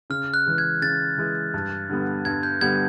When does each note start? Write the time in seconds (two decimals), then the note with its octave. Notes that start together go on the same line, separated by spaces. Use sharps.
0.10 C#3 F6
0.34 F#6
0.46 E3 G#3
0.58 G#6
0.82 C#3 A6
1.18 E3 G#3
1.54 G2
1.89 D3 G3 B3
2.25 G2 G#6
2.43 G6
2.61 D3 G3 B3 G#6